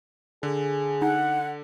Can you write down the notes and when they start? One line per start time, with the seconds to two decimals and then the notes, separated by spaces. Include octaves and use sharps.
0.43 D3 G#4
1.02 D#4 F#5